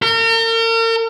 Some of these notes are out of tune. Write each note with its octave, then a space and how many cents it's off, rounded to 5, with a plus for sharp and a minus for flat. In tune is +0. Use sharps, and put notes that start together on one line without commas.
A#4 -40